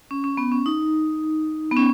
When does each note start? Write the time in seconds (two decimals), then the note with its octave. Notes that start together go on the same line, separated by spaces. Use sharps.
0.11 C#4
0.24 C#4
0.37 B3
0.52 C#4
0.66 D#4
1.71 B3
1.77 C#4